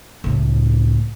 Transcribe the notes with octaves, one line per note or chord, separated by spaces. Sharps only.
C#2 A2